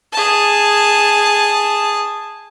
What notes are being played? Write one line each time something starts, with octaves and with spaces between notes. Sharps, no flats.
G#4 A5